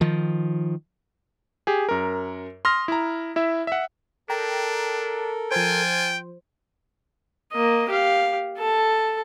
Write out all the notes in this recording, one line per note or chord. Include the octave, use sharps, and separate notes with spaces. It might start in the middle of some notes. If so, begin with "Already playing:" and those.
D#3 F3
G4 G#4
F#2 A#4
C6 D#6 F6 A#6
E4 A#5
E4 E5
E5 F#5
D4 A4 A#4 G5 A#5
F3 F4 C5 G5 G#5
A#3 D#5
G4 F5
A4 A5